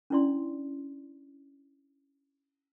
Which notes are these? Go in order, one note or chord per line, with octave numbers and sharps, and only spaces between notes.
C#4 D4 E4 D5 C6